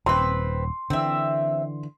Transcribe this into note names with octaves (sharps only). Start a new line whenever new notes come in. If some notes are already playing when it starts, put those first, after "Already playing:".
D#1 C4 B4 C6
D3 E3 C4 E5